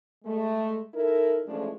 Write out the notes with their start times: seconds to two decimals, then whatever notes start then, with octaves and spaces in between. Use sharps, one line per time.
0.25 G#3 A3
0.94 D#4 E4 A4 A#4
1.47 E3 F3 G#3 A3 C#4 D4